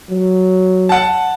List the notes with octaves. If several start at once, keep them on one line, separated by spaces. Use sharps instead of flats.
F#3
F#5 A5